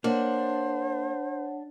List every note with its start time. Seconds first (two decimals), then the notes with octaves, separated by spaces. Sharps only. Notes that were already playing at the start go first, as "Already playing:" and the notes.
0.04 A#3 D4 C5 C#5 F#5